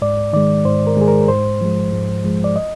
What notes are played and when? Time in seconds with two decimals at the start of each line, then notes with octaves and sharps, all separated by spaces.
0.02 G#2 D5
0.33 D#3 G#3 D5
0.65 G#2 C5
0.87 A#4
0.97 D#3 G#3 G#4
1.08 A#4
1.21 A#4
1.28 G#2 C5
1.61 F3 G#3
1.93 G#2
2.24 F3 G#3
2.44 D5
2.56 D#5